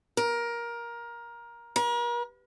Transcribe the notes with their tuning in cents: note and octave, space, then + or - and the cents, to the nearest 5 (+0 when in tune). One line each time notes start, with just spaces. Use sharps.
A#4 +15
A#4 +40